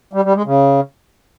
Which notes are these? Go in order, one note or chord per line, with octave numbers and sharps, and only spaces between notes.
G3
G3
G#3
C#3